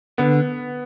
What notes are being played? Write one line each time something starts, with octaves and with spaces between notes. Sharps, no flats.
D3 B3